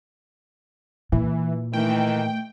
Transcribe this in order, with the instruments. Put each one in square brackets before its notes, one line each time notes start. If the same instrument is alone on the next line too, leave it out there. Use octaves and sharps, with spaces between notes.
[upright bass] A#2 [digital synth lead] E3
[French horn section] D#3 E3 [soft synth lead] A3 [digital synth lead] G5